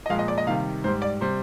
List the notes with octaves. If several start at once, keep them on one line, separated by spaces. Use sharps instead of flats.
D#5
A#2 F3 G#3 F5
D#5
D5
D#5
C3 D#3 G3 F5
G#2 G3 C5
D5
C3 G3 C5